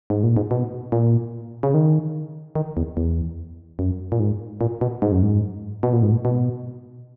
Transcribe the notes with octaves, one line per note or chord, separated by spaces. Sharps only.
G#2
A#2
G#2
B2
A#2
C#3
D#3
D#3
E2
E2
F#2
A#2
G#2
A#2
B2
G#2
F#2
G#2
B2
A#2
G#2
A#2
B2